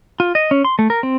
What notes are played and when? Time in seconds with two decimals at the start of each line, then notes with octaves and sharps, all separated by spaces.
0.20 F4
0.35 D#5
0.51 C#4
0.65 C6
0.79 A3
0.90 A#4
1.03 C4